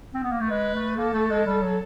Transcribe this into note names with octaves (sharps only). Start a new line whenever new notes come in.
C4
B3
A#3
A3
G#3 B4
A3
A#3 A4
A3
G#3
G3
F#3